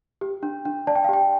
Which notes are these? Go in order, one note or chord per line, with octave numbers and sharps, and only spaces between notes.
G4
D4
D4
D5 A5
G5
F5
G4 G5